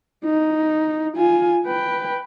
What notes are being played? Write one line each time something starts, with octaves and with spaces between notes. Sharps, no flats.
D#4
F4 G#5
B4 G5